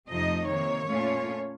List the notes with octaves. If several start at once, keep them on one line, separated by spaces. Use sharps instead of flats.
F2 C3 F3 A3 D#4 D#5
C3 D#3 A#3 C#5
A#2 A3 C#4 F4